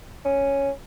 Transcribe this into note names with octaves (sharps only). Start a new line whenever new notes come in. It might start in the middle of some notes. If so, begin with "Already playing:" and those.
C#4